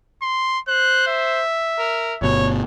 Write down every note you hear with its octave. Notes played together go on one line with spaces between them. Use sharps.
C6
C5 F#6
E5
A#4
G1 B2 C#5